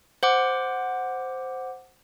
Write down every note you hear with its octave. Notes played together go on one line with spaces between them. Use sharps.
C5 F#5 D6